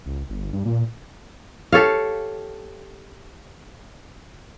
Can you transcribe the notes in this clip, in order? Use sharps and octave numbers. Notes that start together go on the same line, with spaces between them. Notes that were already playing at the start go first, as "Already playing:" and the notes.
C#2
G1
G2
A#2
G4 A4 C#5 F5